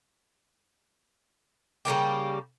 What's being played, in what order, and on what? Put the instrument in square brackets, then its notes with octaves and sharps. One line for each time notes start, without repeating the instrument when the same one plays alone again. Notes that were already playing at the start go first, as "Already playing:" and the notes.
[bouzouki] C#3 G3 A#3 G4